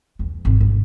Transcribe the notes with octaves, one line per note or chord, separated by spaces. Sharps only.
E2
G#1
G#1